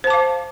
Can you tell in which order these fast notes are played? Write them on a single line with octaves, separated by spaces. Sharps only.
C5 A5 D6 F5